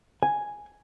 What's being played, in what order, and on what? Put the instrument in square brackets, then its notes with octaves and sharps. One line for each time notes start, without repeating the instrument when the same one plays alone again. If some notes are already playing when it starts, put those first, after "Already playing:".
[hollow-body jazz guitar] G#5